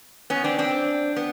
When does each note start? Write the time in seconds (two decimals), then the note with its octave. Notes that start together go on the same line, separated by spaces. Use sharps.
0.30 B3 C#4
0.44 C4 D4
0.59 C4 D4
1.16 B3